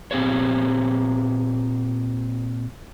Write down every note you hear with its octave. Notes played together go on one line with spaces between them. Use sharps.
A#2 C4 G4 C5 C#5